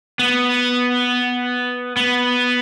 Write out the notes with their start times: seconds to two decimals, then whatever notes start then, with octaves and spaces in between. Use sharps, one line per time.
0.19 B3
1.97 B3